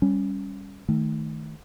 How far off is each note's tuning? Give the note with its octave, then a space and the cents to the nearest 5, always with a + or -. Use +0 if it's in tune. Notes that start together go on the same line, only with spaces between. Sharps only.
G3 +10 C#4 +0
D#3 +0 A3 -10